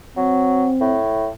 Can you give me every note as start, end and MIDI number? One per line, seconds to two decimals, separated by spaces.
0.17 0.68 54
0.17 0.99 60
0.81 1.27 45